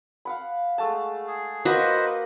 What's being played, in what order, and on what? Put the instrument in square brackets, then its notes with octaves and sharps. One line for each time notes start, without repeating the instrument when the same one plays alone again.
[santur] F5 F#5 B5
G#3 A3 A5
[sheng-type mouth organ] G#4
[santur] A#3 F#5 [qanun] F#4 [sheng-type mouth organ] B4 C5 D#5